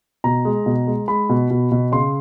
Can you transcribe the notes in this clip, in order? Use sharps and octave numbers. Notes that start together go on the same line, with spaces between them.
B2 A#5
G#3
B2
G#3
G#3 B5
B2
B2
B2
C#3 C6